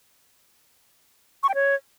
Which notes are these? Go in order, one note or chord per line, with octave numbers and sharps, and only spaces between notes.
C#6
G5
C#5